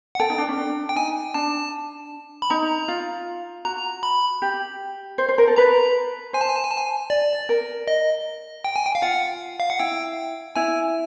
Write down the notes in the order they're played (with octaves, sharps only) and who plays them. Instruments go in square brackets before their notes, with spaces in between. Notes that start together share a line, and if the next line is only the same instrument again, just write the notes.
[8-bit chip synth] F#5
[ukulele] A4 [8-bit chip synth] G5
[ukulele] D#4
D4
C#4
D4
[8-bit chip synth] G5
[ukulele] D#4 [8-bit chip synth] G#5
[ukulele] D4 [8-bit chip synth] A5
[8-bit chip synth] B5
[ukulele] D#4 [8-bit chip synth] A#5
[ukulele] F4
[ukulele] F#4 [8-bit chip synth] A#5
[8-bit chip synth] B5
[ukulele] G4
C5
C5
A#4
A4
[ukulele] B4 [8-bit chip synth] A#5
[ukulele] C5 [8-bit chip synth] G#5
[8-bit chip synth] A5
G#5
A5
G#5
A5
G#5
D5
[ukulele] A#4
[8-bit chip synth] D#5
G5
G#5
G5
F5
[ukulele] F4 [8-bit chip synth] F#5
[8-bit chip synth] F5
F#5
[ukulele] E4 [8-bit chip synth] G5
[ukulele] E4 [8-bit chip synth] G#5